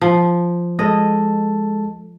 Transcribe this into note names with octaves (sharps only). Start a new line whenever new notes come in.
F3
G#3 A4 D#5 A5